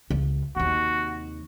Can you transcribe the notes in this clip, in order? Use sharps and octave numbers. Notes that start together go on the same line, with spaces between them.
C#2
D#2 C3 F#4